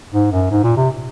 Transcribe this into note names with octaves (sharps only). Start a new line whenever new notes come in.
G#2
F#2
G#2
A#2
C3